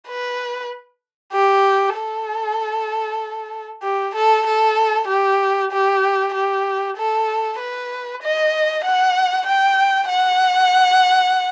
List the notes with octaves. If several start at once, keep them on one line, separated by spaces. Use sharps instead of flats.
B4
G4
A4
G4
A4
A4
G4
G4
G4
A4
B4
D#5
F#5
G5
F#5